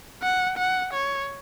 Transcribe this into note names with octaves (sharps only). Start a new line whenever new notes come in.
F#5
F#5
C#5